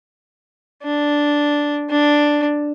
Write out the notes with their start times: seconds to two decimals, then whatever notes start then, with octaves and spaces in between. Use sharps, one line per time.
0.83 D4
1.90 D4